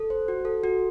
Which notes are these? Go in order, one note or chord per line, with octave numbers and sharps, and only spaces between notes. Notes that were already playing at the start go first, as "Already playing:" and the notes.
Already playing: A4
C5
F#4
A4
F#4